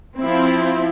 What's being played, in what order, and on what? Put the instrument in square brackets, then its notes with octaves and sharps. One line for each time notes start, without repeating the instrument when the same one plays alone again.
[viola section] F3 C4 E4